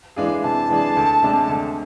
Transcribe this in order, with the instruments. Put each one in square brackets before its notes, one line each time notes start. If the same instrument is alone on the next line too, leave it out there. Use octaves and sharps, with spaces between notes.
[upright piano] E3 G#3 D4 G#4 [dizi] F5
[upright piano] C3 [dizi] A5
[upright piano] E3 G#3 D4 G#4
D2
C3 G#3 D4
D2